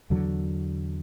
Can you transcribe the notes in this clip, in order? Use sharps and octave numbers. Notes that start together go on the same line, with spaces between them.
E2 D3 F#3